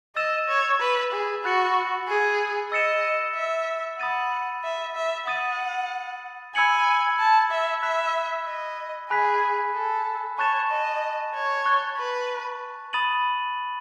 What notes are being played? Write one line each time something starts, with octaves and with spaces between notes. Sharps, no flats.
D#5 E6 A6 E7
C#5
B4
G#4
F#4 B5 F#6 A6 C#7 F#7
G#4
D#5 E6 A6 C#7 E7
E5
F#5 B5 D#6 A6 D#7
E5
E5
F#5 D#6 A6 D#7
G#5 B5 E6 G#6 C#7 F#7
A5
E5
E5 B5 F#6 B6
D#5
G#4 G#5 B5 F#6 B6
A4
C#5 A5 C#6 F#6 A6 E7
D#5
C#5
C#6 F#6 A6
B4
B5 D#6 A6 D#7 F#7